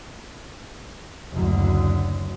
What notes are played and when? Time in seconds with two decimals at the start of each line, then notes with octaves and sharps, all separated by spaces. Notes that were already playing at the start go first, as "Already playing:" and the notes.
1.32 F#1 D2